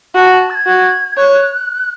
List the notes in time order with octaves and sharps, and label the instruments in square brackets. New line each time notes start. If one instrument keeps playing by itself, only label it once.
[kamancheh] F#4 [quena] A5
[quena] A5
A6
G#6
[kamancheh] F#4
[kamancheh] C#5 [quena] F#6